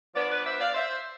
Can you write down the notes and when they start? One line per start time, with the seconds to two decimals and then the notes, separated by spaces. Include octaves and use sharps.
0.14 F3 B3 D4 B4 D5
0.30 B4 D5
0.45 C5 E5
0.60 D5 F5
0.74 C5 E5